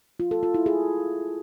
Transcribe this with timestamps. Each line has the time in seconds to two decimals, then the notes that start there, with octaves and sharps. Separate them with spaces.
0.20 F4
0.31 A4
0.43 F4
0.54 E4
0.66 G#4